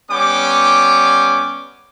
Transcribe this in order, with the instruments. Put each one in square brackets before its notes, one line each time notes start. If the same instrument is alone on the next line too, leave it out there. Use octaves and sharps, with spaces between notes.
[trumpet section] G3 B3 C#4 G5 D6